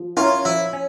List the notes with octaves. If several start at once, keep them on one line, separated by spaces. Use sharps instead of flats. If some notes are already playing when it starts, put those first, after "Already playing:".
Already playing: F3
C#4 E4 F4 A#4 C#5
F3 E4
C#4